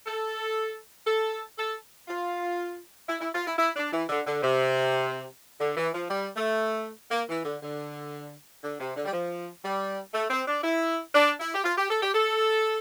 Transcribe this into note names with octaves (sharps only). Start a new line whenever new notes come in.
A4
A4
A4
F4
E4
E4
F4
E4
E4
D4
E3
D3
D3
C3
D3
E3
F3
G3
A3
A#3
E3
D3
D3
D3
C3
D3
G3
F3
G3
A3
C4
D4
E4
D4
E4
G4
F4
G4
A4
G4
A4